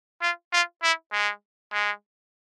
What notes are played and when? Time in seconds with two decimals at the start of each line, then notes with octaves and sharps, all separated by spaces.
0.22 F4
0.53 F4
0.83 E4
1.12 G#3
1.73 G#3